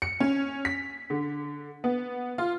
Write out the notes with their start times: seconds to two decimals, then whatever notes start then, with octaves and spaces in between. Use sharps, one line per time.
0.02 C#7
0.20 C#4
0.65 B6
1.10 D3
1.84 B3
2.38 F4